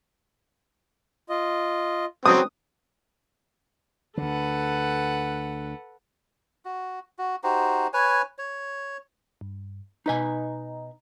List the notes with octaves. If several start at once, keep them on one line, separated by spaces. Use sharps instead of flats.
F4 D#5
F#3 C4 B4 G5 D#6
D2 D3 A4 B4 F#5
F#4
F#4
D#4 F#4 G4 C5
B4 C#5 G#5
C#5
G2
B2 D#4 B4 D#5 G#5 A#5